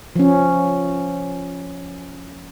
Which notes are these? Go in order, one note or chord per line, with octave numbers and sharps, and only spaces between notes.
F3 C#4